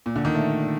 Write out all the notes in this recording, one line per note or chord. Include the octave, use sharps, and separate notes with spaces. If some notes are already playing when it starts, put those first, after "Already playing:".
A#2
D3
D#3
A3